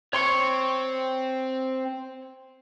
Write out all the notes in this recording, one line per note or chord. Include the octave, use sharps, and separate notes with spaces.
C4 C#5 C6 C#6